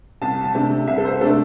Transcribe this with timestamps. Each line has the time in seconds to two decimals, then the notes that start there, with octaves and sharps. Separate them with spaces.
0.22 C2 A5
0.44 A5
0.55 C3 A3 D4
0.87 C2 E5
0.98 A4
1.05 C5
1.21 C3 A3 D4 A4